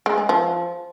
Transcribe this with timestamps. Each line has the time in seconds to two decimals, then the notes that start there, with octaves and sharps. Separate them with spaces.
0.06 G#3
0.18 G#4
0.29 F3